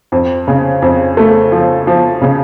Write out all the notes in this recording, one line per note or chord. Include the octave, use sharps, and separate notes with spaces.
F2
C#3
F2
A3
F3
F3
C#3